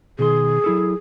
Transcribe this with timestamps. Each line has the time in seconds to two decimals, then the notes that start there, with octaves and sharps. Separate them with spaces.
0.19 B2 D#3 G#4 C6
0.64 F#3 E4 A4